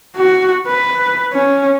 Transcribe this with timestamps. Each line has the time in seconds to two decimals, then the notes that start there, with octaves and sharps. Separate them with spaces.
0.16 F#4
0.67 B4
1.32 C#4